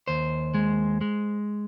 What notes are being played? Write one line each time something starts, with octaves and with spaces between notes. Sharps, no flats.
D#2 C5
G#3
G#3